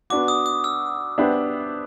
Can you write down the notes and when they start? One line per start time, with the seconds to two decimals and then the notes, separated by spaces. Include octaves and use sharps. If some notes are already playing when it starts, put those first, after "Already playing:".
0.10 B3 D4 F#4 D6
0.28 D#6
0.46 D#6
0.64 E6
1.18 B3 D4 G4 C5 E5